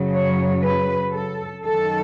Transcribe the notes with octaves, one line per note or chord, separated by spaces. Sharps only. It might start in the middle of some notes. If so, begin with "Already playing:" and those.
Already playing: F#2 C#3 F#3
C#5
B4
A4
F#2 D#3 F#3 A4